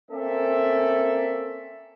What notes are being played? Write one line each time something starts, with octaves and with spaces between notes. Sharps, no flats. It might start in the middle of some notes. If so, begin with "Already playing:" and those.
A#3 C4 C#4 A4 D5 E5